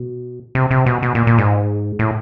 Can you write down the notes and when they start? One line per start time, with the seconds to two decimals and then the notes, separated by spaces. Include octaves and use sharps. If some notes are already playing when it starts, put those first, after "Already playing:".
Already playing: B2
0.55 C3
0.71 C3
0.86 B2
1.02 B2
1.15 A#2
1.27 A#2
1.38 G#2
1.99 A2